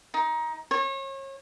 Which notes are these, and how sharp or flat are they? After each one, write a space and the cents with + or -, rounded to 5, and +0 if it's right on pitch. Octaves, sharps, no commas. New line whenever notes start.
D#4 +20
C#5 -35